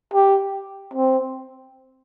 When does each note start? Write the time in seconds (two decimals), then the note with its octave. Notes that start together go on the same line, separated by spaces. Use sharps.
0.13 G4
0.94 C4